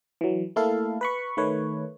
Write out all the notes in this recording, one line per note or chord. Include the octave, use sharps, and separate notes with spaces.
E3 F#3
A3 A#3 E4 A4 F5
B4 B5 C#6
D#3 A3 B4 C#5